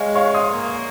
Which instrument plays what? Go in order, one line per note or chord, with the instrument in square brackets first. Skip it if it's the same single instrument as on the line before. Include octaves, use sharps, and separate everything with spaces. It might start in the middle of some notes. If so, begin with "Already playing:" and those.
Already playing: [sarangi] G#3 [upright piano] C#5 F5
[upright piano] C#5 F5
C6 D#6
[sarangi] A#3